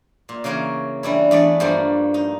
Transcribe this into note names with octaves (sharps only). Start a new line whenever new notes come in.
A#2
C#3 E3 A#3 A#4 C#5
E3 G3 D4 E4
E2 A3 D4 D5
G2 F3 A3 A#3
D#4